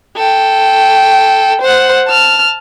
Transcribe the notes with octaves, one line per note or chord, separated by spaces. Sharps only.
A4 G5
C5 F#5
A5 F6